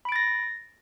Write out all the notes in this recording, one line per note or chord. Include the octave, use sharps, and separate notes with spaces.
B5 A6 A#6 D7